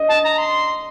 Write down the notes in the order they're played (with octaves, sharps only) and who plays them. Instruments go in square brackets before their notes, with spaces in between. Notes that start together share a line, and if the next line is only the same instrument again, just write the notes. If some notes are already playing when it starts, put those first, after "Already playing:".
Already playing: [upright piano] D#5
[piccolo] A5
A#5
C6